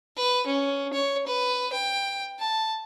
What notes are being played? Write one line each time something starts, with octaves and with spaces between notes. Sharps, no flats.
B4
C#4
C#5
B4
G5
A5